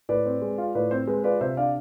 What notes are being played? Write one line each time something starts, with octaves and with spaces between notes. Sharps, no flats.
A2 B4 D5
C4
G#3
F4
A2 B4 D5
C4 C5
G#3 B4
F4 B4 D5
C3 C5 E5
D4 D5 F5